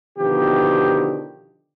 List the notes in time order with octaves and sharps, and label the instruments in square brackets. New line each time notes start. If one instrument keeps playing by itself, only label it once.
[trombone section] B2 D3 D#3 F3 G4